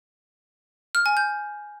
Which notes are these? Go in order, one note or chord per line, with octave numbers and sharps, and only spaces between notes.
F6
G#5
G6